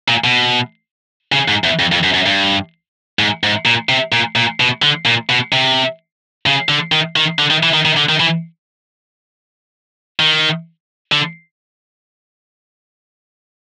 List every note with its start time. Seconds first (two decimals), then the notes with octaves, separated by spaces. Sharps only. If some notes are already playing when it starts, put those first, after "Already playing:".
0.08 A#2
0.24 B2
1.33 C#3
1.48 G#2
1.64 E2
1.80 F2
1.92 F2
2.04 F#2
2.14 F#2
2.26 G2
3.19 G#2
3.44 G#2
3.66 A#2
3.89 C3
4.12 A#2
4.36 A#2
4.60 B2
4.82 D3
5.06 A#2
5.30 B2
5.53 C3
6.47 C#3
6.69 D3
6.92 D#3
7.16 D#3
7.39 D3
7.51 D#3
7.63 E3
7.74 D#3
7.85 D#3
7.97 D3
8.09 D#3
8.20 E3
10.20 D#3
11.12 D3